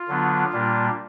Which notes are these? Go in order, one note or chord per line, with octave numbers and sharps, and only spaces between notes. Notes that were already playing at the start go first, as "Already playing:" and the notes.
Already playing: F4
D3 F#3 B3 D4
A#2 G3 A#3 D4